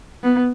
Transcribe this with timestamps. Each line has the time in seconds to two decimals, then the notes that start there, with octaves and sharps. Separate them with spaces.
0.23 B3